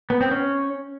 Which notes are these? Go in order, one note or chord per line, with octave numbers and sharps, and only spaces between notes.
B3
C4
C#4